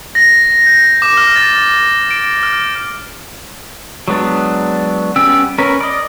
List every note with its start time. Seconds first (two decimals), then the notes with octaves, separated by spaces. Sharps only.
0.15 A#6
0.66 G6
1.02 D6
1.17 F6
1.36 A6
2.11 D7
2.43 F6
4.08 F#3 G#3 B3 D4
5.16 G3 B3 C#4 G5 E6
5.58 C#4 A#4 B4
5.81 D5 D#5